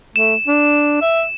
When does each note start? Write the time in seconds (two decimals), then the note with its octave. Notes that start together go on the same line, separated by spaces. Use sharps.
0.16 A3 E7
0.48 D4
1.02 E5